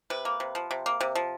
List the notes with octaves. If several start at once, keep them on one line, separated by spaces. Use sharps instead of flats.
C3 B4
A#3
C3
F3
C3
A#3
C3
F3